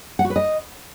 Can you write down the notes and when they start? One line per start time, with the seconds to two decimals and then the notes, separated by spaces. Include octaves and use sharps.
0.19 F#5
0.25 F#4
0.30 B4
0.36 D#5